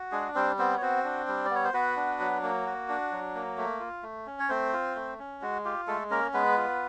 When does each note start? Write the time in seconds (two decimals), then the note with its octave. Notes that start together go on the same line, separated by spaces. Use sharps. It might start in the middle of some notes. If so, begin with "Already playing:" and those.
Already playing: F#4
0.12 G#3 D4 G#4
0.35 G3 C4 C5
0.58 B3 C4 C5
0.77 C#5
0.81 C4 F#4 C5
1.04 D4
1.28 G3
1.45 D5
1.50 B3 C#5
1.64 C5
1.73 B3 F#4 B4
1.96 D4
2.20 F#3
2.43 A#3
2.66 F#4
2.89 D4
3.12 F#3
3.35 A#3
3.58 A3
3.80 F4
4.03 A3
4.27 C#4
4.40 C#5
4.49 A3 C4 C5
4.73 F4
4.95 A3
5.19 C#4
5.42 G#3 F#4
5.65 F4 G4
5.87 G#3 A3 A4
6.10 A#3 C#4 A#4
6.34 G#3 B3 B4
6.57 F4